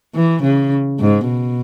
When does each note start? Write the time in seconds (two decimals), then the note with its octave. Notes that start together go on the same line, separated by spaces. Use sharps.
0.15 E3
0.43 C#3
1.00 G#2
1.28 B2